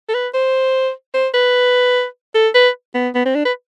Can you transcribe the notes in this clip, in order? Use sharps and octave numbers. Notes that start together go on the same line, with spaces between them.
A4
B4
C5
C5
B4
A4
B4
B3
B3
C4
D4
B4